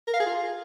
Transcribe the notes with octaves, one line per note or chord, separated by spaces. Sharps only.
A#4
F5
G#4
F4